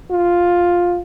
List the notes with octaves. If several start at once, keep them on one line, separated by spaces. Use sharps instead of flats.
F4